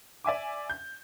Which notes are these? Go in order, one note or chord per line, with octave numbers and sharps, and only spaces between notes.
D5 E5 G#5 D6
G6